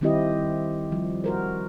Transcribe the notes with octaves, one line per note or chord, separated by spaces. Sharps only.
D#3 G3 C4 E4 G4 D#5
F3 G3
F#4 A#4 C5